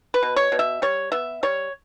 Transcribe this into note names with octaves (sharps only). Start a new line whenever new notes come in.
B4
B2
C#5
B2
E5
G3 C#5
B3 E5
G3 C#5